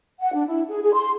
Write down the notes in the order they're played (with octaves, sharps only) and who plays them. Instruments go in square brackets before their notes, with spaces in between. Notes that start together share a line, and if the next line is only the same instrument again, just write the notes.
[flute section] F#5
D4
E4
G#4
G#4
C6